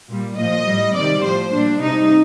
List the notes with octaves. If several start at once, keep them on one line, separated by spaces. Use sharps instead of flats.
A#2 G3
A#2 F3 D#5
A2 G3
C3 D#3 G3 D5
A2 F3 C5
A#2 G3 D4
C3 G3 D#4